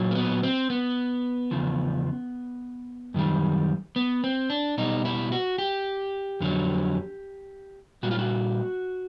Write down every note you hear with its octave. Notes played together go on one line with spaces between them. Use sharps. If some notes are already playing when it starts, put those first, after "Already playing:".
Already playing: A#2 F#3
A#3
B3
C4
B3
E2 C#3 F3
F#2 D#3 G3
B3
C4
D4
B2 G3 D#4
E4
F#4
G4
F2 D3 F#3
A#2 G3 F#4
F4
F#4